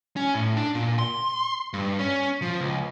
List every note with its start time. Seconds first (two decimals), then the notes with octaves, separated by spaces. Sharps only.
0.16 C#4
0.35 A2
0.57 D4
0.75 A#2
0.99 C6
1.73 G2
1.99 C#4
2.42 F3
2.61 C#2